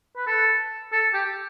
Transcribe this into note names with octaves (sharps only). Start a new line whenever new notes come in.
B4
A4
A4
G4